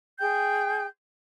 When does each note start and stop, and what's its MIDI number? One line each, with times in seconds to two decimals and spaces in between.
0.20 0.85 68
0.20 0.85 79
0.20 0.85 91